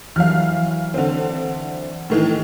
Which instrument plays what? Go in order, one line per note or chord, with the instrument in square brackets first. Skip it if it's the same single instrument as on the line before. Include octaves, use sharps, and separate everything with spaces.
[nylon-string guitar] E3 F#3 [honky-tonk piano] F5 F6
[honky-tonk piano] D3 C4
A2 D#3 E3